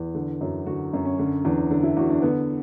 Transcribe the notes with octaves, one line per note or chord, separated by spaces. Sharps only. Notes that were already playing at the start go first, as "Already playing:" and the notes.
Already playing: E2
D3
F#2
D3 F#4
F#2 C#4
C#4
D3 C#4
E2 D4
D3 D4
E4
E2 F#4
D4
D3 B3